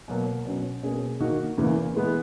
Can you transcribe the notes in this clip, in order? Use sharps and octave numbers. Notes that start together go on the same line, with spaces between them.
B2 F#3 A#3
B2 F#3 C#4
B2 A#3 C#4 G#4
D#3 A#3 D#4 F#4
E2 C#3 E3 A#3
E3 G#3 B3